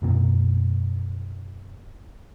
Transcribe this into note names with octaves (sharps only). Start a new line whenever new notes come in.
C#2 F#2 B2 A#3